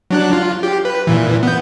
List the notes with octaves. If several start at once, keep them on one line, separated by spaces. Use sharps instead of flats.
F#3 D4 F#6
F4
G4
B4
A#2 E3
B3 G6